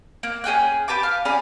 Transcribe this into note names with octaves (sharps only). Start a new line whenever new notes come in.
A#3
C#4 G#4 G5 F#6
G4 B4 A5 D6
F5
C#4 G#4 D5 B5